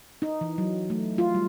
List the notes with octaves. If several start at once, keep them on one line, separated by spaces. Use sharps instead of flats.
D#4
E3
F#3
A3
F4
G3